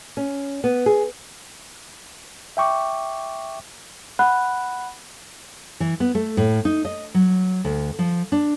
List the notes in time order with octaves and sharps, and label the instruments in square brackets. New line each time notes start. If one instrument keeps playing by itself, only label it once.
[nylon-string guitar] C#4
B3
G#4
[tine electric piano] E5 G5 C#6 D6
[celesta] F#5 B5 F#6
[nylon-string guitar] E3
B3
A3
A2
D#4
D#5
F#3
D2
F3
D4